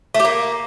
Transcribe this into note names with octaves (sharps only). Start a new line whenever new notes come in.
A3
G4
A#3